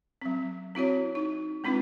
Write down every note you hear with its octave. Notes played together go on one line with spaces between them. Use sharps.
F#3 C4
C4 E4 F#4 C#5
D#4
G#3 C4 D4 F4 B4